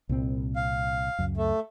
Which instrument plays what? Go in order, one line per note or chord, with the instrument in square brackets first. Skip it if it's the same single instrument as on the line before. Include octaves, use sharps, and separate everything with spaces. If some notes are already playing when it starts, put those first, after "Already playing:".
[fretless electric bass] C2 A#2 C4
[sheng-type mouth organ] F5
[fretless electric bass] C#2 F#2
[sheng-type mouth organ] A3